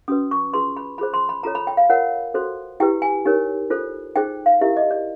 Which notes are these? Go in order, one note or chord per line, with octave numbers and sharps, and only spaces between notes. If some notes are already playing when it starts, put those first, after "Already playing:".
C#4 F#4 B4 D#6
C#6
F4 G#4 B4 C6
B5
F4 G#4 C5 B5
C6
B5
F4 A4 C#5 A#5
B5
G5
F5
F4 A#4 C#5 F#5
F#4 A4 C5
E4 G4 B4 G5
G#5
D#4 G4 A#4 C#5
F4 A4 C5
D#4 G#4 C5 G5
F5
E4 G4 A#4 E5
D#5
D5